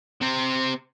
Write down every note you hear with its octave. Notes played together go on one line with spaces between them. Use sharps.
C3 C4